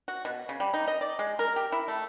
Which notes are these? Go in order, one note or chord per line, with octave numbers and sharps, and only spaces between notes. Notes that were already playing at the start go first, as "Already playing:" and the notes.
F#4
B2
C#3
G3
D#4
D#5
D5
G#3
A#4
G4
E4
A3